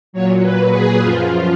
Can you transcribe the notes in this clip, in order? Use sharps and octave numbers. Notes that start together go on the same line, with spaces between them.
A#2 F#3 C#5
B4
G#4
F#2 F3 F4